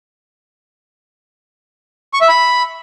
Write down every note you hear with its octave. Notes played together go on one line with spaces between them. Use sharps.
C#6
E5
B5